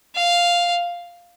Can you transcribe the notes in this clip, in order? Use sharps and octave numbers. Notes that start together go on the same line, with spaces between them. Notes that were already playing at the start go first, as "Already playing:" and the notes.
F5